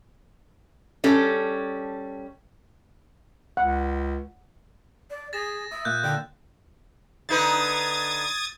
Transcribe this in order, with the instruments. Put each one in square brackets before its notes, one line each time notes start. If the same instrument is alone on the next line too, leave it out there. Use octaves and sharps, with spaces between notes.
[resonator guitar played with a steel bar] G3 C#4 A4
[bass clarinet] C#2 [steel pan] F#5
[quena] D5
[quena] G#4 [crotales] A6 A#6 E7
[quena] E5 [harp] D#6
[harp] A#2 [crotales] F#6 G6
[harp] D3 [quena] G5
[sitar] D3 D#4 B4 [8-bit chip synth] D#6 G#6 A6